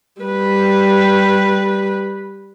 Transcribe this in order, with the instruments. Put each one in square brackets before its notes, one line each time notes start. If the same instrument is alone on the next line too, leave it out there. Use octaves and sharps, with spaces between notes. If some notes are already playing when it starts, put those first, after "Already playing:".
[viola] G3 B4